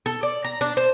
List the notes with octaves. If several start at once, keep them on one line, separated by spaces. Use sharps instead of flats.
A4
D5
A#5
D4
C5